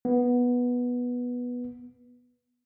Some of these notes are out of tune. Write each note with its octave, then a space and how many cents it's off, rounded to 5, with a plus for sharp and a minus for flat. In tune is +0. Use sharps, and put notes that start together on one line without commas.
B3 -10